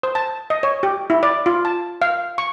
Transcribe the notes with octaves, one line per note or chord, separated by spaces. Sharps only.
C5
A5
D#5
C#5
G4
E4
D5
F4
A5
F5
C#6